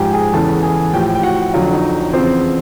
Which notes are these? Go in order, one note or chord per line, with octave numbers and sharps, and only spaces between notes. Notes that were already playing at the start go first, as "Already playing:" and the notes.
Already playing: G#2 F3 G4 G5 G#5
G#4 G#5
E2 C#3 E3 A4 A5
G#4 G#5
A2 F3 G4 G5
G5
F#4 F#5
F2 D3 F#3 F4 F5
D#4 D#5
E2 C#3 F3 C4 C5